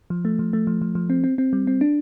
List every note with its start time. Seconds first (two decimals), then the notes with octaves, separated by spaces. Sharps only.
0.10 F3
0.25 A3
0.39 F3
0.53 A3
0.67 F3
0.82 F3
0.95 F3
1.10 C4
1.24 C4
1.38 C4
1.53 G3
1.67 C4
1.81 D4